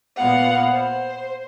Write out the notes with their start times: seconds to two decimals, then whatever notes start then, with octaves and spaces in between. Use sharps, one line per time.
0.17 A#2 B3 F5 F#5
0.73 C5